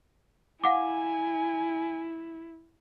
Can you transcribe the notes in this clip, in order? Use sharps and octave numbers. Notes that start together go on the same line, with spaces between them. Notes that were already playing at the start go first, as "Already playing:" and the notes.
E4 F5 F#5 G#5 D6